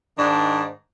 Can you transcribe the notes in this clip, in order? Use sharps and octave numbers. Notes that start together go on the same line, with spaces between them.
G#2 D#3 D4